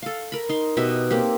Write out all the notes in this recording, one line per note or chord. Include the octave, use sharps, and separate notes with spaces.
A4 F5
A#4 B5
D#4 C6
B2 D#4 G4 E5
A#3 C4 G4